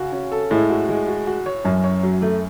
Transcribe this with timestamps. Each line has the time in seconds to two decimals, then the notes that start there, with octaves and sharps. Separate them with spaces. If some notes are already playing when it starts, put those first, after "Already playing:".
Already playing: C#3 F#4
0.12 C#4
0.32 A4
0.51 A2 G#3
0.70 F#4
0.89 G#3
1.08 F#4
1.27 F#4
1.46 C#5
1.64 F#2 C#4
1.84 C#5
2.03 F#3
2.22 A3